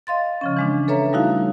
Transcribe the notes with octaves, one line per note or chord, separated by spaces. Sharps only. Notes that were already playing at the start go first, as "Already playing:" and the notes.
D#5 F5 C6 A6
C#3 F3 C#4
E3 G#3 D4
A4 B4 C#5 E5 A#5
G3 A3 D#4 E4 F#4 F5